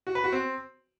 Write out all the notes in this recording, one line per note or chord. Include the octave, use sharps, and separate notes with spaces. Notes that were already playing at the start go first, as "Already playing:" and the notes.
F#4
B4
F#4
C4